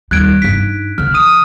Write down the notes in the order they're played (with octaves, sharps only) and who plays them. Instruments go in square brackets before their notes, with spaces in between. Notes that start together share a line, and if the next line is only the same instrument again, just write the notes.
[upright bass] D#2 G3 [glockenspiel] F#6 G#6 D7
[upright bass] G2 D#4 [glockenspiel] B6
[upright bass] D3 F3 [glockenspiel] F6
[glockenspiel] D#6 D#7